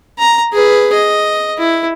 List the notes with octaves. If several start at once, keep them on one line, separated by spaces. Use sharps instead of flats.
A#5
G#4 B4
D#5
E4